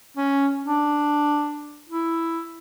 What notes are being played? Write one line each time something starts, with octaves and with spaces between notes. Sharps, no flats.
C#4
D4
E4